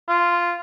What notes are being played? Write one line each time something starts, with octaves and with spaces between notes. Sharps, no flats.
F4